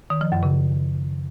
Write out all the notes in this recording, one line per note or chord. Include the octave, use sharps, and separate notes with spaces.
D#3
F3
F#2
C#3